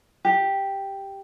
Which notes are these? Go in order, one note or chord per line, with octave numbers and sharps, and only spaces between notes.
G4